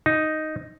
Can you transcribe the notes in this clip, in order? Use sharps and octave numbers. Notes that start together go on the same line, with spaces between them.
D#4